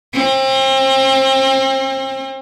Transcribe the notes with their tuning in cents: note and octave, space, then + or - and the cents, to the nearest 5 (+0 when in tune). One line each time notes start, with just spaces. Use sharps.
C4 +35